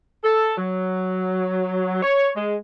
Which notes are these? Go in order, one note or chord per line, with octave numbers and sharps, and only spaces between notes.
A4
F#3
C#5
G#3